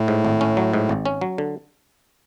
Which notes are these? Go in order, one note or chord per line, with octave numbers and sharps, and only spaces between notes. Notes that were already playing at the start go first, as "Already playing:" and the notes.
Already playing: A2
G#2
G#1
C#4
F#3
G#2
G#1
C#4
F#3
D3